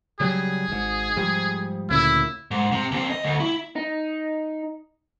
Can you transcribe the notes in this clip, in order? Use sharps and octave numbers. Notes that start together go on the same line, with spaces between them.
C#3 F#3 G3 G#4
G#1 G#2
G#2 F3 G3
D2 A#2 C#3 E4
G#2
C3
D#2 C4
D#5
D2
E4
D#4